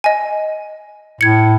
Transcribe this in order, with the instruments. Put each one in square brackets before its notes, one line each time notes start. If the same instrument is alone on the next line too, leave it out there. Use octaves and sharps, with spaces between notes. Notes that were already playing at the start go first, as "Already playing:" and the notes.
[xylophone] D#5 G#5
[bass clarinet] A2 [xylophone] G#6 C#7